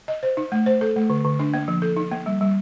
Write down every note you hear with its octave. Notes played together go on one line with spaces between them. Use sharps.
D#5
C5
D#4
A3
C5
A4
A3
D3
D3
D4
A#3
F3
A4
D#4
A#3
G3
G3